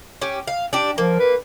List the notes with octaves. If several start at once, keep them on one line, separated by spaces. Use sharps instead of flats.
C#4 G4
F5
D4 G4
F3 A#3
B4